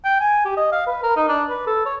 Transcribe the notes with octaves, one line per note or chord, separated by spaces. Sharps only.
G5
G#5
G4
D#5
F5
B4
A#4
D#4
D4
B4
A4
C#5